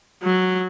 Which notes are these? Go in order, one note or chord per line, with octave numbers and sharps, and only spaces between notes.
F#3